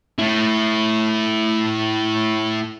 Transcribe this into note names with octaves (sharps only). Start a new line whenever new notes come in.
A3 E4